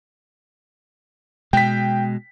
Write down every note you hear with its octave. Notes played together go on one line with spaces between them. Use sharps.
B2 G#3 G5 B6